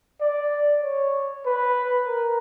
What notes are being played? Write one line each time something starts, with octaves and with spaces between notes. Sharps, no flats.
D5
C#5
B4
A#4